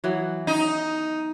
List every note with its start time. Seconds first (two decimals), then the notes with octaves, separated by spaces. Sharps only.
0.04 E3 F#3 B3
0.47 D#4